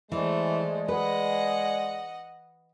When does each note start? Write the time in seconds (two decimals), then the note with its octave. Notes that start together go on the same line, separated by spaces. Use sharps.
0.12 E3 G#3 A3 C5 D5
0.88 B4 D#5 F#5